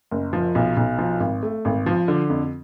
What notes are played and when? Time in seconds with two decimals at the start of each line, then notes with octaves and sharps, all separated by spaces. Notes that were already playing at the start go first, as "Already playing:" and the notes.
0.11 F#1
0.33 F3
0.55 B1
0.77 B1
0.98 F3
1.20 G#1
1.43 A3
1.65 G#1
1.86 F3
2.08 D3
2.30 F2